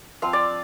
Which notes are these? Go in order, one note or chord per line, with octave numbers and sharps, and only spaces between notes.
F3 C4 F4 F5
D5